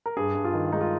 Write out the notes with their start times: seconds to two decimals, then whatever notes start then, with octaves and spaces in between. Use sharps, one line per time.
0.06 A#4
0.17 G2 G#4
0.35 G2
0.45 F4
0.54 D#3
0.72 G#3 D#4
0.81 F4